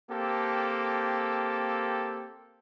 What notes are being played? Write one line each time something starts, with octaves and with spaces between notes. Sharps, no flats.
A#3 C4 G4 A4